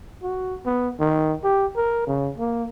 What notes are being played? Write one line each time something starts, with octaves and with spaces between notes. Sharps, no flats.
F#4
B3
D#3
G4
A#4
C#3
A#3